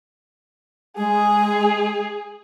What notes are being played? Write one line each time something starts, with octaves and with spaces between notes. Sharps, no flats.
G#3 G#4